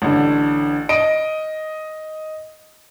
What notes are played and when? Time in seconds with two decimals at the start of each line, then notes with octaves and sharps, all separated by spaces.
0.02 A1 D3
0.89 D#5 D7